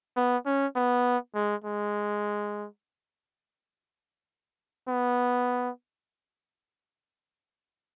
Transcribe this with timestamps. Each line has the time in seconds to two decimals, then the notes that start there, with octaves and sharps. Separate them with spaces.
0.17 B3
0.46 C#4
0.76 B3
1.35 G#3
1.64 G#3
4.88 B3